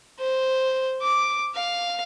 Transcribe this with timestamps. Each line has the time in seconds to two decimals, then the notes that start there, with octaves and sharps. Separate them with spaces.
0.19 C5
1.01 D6
1.55 F5